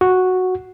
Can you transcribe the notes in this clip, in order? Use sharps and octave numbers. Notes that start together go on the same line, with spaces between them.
F#4